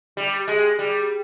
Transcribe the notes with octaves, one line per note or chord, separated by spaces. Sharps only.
G3
G#3
G3